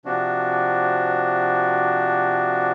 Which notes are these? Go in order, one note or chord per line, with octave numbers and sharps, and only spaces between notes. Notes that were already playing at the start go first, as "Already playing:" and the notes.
C3 F3 D4 F#4